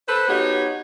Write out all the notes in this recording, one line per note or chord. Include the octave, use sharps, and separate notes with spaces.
A4 B4 C5
B3 D#4 F#4 G4 C#5